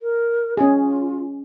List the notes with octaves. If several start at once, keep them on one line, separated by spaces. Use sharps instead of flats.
A#4
C#4 F4 G#4